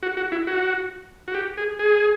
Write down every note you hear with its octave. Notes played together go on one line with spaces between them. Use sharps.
F#4
F#4
E4
F#4
F#4
G4
G#4
G#4